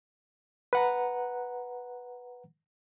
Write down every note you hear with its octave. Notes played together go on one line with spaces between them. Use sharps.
B4 F#5 A#5